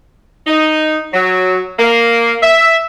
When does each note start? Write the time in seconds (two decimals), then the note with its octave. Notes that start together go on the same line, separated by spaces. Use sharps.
0.47 D#4
1.13 F#3
1.79 A#3
2.42 E5